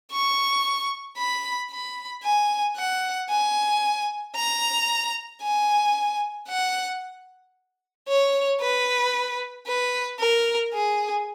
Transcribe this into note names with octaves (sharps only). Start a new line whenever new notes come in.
C#6
B5
B5
G#5
F#5
G#5
A#5
G#5
F#5
C#5
B4
B4
A#4
G#4